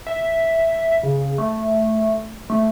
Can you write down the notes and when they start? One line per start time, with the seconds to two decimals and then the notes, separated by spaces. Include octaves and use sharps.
0.07 E5
1.03 C#3
1.38 A3
2.50 A3